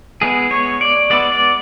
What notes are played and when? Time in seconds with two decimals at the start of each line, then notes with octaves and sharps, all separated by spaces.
0.21 G#3 B3 E4 G#4
0.51 C#5
0.81 D5
1.10 G#3 B3 E4 D5
1.32 D5